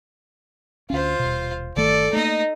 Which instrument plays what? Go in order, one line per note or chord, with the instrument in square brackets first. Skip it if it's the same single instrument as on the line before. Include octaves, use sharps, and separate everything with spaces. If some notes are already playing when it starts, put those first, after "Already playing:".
[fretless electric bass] D2 C#4 [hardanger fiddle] F4 C5
[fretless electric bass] D#1 B2
[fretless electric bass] G1 D#3 A3 [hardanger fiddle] A4 D5
[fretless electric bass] A3 A#3 [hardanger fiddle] D#4 D#5